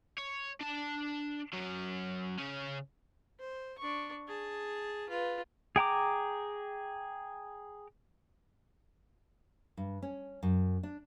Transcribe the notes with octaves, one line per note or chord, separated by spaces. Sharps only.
C#5
D4 A5
F#3 C#4
C#3 C#4
C5
D4 C#6
G#4 A5
F4 B4
G#4 G5 A#5 D6
G2
C#4
F#2
D4